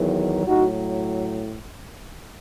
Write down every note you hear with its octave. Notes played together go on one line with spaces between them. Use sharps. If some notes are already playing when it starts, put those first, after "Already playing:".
Already playing: E2 D#3 F#3
A2 F#3 D#4 F#4